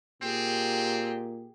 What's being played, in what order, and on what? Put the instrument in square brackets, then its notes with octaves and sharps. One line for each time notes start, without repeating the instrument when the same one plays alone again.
[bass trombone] A#2 [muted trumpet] C4 [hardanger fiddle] G4 G#4